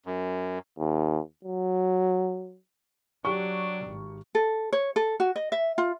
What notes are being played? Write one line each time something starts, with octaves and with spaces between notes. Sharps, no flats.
F#2
D#2
F#3
F#3 D4 G4 C#6
G#1
A4
C#5
A4
F#4
D#5
E5
F4